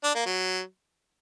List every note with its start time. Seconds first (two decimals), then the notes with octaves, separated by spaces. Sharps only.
0.04 D4
0.15 A#3
0.26 F#3